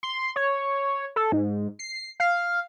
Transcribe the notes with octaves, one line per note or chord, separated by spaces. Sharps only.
C6
C#5
A4
G#2
C7
F5